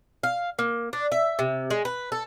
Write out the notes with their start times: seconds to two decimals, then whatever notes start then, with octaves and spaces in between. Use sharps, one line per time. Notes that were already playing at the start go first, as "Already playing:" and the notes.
0.23 F5
0.59 A#3
0.93 D4
1.12 E5
1.39 C3
1.70 G#3
1.85 B4
2.12 A4